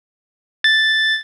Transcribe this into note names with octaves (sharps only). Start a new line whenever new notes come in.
A6